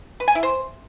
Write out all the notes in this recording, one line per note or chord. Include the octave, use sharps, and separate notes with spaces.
B4
G#5
E4
C5